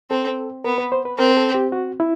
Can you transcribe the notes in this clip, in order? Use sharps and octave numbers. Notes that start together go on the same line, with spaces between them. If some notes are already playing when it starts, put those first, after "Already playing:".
C4 A4
B3 A#4
B4
C5
B4
C4 A#4
A4
G4
F#4
E4